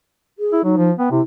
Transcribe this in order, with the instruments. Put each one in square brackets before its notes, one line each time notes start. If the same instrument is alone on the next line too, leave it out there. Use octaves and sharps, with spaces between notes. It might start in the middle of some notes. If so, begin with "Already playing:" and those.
[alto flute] G#4
[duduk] E4
[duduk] F#3 [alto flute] D#4
[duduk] F3
[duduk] B3 [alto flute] G5
[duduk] C3 [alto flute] E4